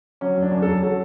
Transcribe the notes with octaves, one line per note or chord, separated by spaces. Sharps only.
F#3 C#4
F#2 D4
F#2
F#2 A4
F#3 A4